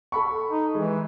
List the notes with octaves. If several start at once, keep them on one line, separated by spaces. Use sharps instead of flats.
A4 B5 C#6
D#4
E3 G#3